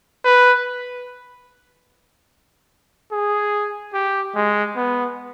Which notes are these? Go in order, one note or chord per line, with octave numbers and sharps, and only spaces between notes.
B4
G#4
G4
G#3
B3